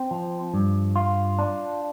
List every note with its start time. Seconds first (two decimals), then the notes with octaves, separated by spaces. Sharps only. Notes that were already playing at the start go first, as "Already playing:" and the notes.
Already playing: C4
0.11 F3
0.54 G2
0.96 F4
1.39 D4